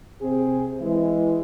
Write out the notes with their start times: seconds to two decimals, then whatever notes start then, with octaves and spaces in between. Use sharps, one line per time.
0.21 C3 C4 G#4
0.79 E3 G#3